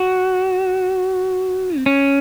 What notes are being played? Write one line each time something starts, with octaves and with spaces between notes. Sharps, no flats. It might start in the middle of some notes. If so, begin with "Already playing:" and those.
Already playing: F#4
C4
C#4